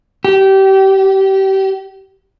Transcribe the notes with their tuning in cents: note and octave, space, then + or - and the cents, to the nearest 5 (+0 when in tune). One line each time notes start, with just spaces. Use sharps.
G4 -25